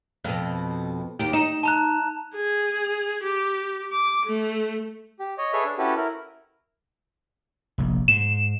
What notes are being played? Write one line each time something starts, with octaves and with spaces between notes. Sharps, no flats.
F2 B2
D#2 G4
D#4 E7
A5 A#5 F#6
G#4
G4
D6
A3
G4
C#5 D#5
G#4 A4 B4 C#5 E5
D4
C#4 E4 F#4 G4 A4 B4
E4 A#4
F1 A#1
G#2 E7